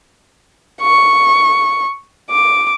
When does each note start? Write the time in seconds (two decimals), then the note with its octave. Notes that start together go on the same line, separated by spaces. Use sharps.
0.82 C#6
2.30 D6